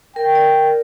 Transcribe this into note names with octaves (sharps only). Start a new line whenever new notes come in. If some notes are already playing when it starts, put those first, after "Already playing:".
A#4 G5
D5